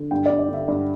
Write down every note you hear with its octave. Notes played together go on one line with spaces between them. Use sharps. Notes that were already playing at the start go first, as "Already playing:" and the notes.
Already playing: D3
G2 G5
G2 D5
D5
D3
E5
G2 D5